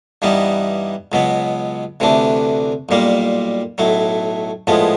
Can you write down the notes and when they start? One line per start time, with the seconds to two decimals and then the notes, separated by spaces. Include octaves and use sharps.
0.22 G2 E3 G3 B3 D#4
1.12 C#2 B2 F#3 B3
2.00 D2 C3 E3 A3 D4
2.89 B1 A#2 G3 A#3
3.78 B1 A2 F#3 A3
4.67 A#1 A2 F3 G#3 B3